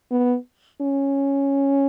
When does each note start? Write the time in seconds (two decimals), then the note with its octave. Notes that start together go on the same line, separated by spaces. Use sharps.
0.11 B3
0.81 C#4